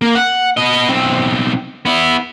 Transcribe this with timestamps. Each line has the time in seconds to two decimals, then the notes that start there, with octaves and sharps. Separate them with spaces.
0.02 A#3
0.15 F#5
0.57 B3 D#5
0.89 B1 C4
1.85 B3 E4